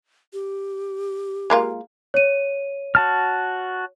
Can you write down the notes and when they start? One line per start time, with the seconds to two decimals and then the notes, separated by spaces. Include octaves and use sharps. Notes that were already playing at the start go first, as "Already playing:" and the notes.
0.33 G4
1.50 G#3 A#3 F4
2.14 C#5 D#7
2.95 F#4 A5 F6